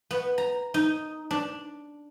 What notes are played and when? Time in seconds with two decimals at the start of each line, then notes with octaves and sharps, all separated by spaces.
0.11 B3
0.38 A#5
0.74 D#4
1.31 D4